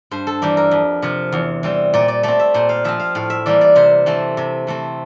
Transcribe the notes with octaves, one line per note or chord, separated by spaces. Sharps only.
G2 C5
A4
E3 G3 A#3 G4
A#4
F2
C3 F3
E2
E3 G3 C4
A#2 D5
D5
A3 C4 D5
E5
A#2 C5
F5
F3 C4 E5
F5
A2 F5
E5
E3 G3 A#3 D5
D5
C3 C5
E3 A3 C4
C3
E3 A3 C4